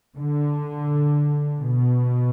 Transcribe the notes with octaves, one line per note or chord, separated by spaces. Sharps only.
D3
B2